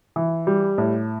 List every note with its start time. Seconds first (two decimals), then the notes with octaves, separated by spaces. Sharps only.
0.16 E3
0.47 G3
0.78 A2